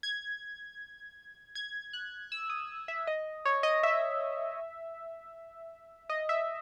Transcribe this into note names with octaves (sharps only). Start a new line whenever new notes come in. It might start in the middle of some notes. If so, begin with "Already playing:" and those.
G#6
G#6
F#6
E6
D#6
E5
D#5
C#5
D#5
E5
D#5
E5